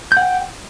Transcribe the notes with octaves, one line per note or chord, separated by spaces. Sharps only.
F#5 G5 G6